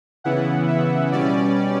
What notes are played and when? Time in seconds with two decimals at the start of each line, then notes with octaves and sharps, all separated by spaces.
0.24 C#3 E3 B3 E4 F#5
0.68 E5
1.12 B2 G3 C#4 D5